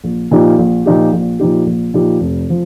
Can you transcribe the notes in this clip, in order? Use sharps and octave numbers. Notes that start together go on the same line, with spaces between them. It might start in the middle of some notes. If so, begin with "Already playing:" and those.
A#1
A#2 F3 D#4 G4
A#1
A#2 F3 D#4 G4
A#1
A#2 F3 D#4 G4
A#1
A#2 F3 D#4 G4
F1
F3